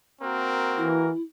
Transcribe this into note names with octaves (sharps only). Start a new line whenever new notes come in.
A#3 C4 F#4 A#4
E3 E4